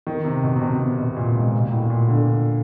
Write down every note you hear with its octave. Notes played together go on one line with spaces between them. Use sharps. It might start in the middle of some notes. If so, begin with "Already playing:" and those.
D#3
C3
B2
C3
B2
C3
B2
A#2
G#2
B2
A#2
A2
A#2
D3